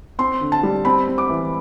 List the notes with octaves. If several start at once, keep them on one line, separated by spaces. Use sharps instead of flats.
C4 C6
D3
A5
G3
C4 B5
C4
D6
E3